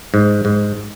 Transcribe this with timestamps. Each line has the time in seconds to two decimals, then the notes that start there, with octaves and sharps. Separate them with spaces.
0.14 G#2
0.45 G#2